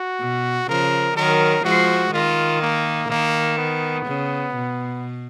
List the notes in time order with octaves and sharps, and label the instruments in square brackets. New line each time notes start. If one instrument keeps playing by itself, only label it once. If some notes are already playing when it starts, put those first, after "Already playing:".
Already playing: [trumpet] F#4
[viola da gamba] B2
[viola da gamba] C#3 F3 [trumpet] A#4
[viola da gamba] D#3 F#3 [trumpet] A#4
[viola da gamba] F3 G#3 [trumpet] F#4
[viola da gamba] D#3 [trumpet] F4
[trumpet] A#3
[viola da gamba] D#3 [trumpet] A#3
[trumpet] B3
[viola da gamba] C#3
B2